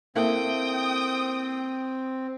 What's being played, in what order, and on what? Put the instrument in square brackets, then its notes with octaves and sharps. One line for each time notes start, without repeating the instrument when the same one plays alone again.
[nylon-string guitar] A#3 E4 A4 [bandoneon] C4 [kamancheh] G5 D#6